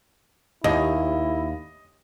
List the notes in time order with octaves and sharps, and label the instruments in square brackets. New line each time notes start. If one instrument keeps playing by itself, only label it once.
[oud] D#2 [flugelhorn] E4 [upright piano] D#5